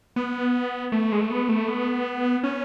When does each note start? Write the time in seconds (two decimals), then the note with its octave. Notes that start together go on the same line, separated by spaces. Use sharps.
0.16 B3
0.92 A3
1.12 G#3
1.21 A3
1.30 B3
1.49 A3
1.68 B3
2.43 C#4